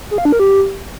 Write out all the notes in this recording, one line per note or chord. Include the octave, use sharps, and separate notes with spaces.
G#4
F5
D4
A#4
G4